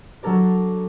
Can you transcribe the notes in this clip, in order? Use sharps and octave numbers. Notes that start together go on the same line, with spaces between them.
F#3 D4 A4 A#4 D5